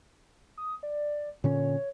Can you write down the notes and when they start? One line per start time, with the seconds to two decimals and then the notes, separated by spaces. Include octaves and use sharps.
0.58 D#6
0.83 D5
1.44 A#2 D3 C#4 C#5